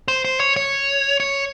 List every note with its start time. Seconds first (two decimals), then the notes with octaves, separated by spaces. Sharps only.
0.08 C5
0.25 C5
0.40 C#5
0.56 C#5
1.20 C#5